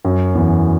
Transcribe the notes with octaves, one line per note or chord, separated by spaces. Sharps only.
F#2
E2